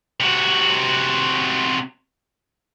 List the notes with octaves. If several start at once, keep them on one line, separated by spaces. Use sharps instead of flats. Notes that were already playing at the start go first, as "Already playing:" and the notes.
C3 F#4